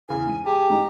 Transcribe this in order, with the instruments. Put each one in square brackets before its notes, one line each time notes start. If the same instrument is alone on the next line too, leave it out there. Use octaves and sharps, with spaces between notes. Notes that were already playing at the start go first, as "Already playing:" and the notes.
[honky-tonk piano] E2 C#3 E3 [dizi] G#5
[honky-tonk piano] G#2 D#7
[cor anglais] G4 [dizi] G#4 [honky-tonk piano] G#5 A5
[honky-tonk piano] G#2 D#4 [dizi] A#5